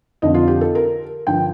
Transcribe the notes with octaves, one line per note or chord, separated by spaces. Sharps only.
F2 D3 F3 D#5
F4
G4
A4
A#4
G2 D3 F3 G5